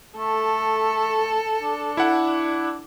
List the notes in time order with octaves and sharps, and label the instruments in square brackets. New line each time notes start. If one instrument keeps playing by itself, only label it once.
[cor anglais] A3 [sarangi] A4
[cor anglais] D4
[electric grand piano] E4 F#5